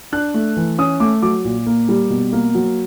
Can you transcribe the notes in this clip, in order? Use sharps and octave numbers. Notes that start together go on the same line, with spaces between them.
D4 F#6
A3
E3
C#4 D#6
A3 D6
F#3 D6
A#2
A#3
G3
B2
A#3
F#3